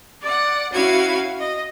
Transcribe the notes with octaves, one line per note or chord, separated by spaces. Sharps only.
D5 F#5
C#4 E4 F#4 F5 G#6
D#5